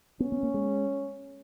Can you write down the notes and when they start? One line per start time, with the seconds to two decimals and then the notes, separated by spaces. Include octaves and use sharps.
0.20 B3 C#4
0.32 B3
0.43 A#3
0.54 G#3